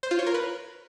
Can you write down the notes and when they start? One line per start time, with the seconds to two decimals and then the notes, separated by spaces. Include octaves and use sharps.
0.03 C5
0.11 F4
0.19 C#5
0.27 A#4
0.34 B4